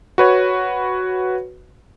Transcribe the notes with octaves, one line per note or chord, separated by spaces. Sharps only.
F#4 B4 C#5